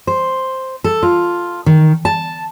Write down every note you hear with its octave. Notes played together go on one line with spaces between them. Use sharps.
C5
A4
F4
D#3
A5